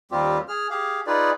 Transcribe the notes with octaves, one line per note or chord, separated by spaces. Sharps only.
D#2 G3 C4 F4 G4
G#4 F6
G4 G#4 F5
D#4 F4 G#4 B4 D5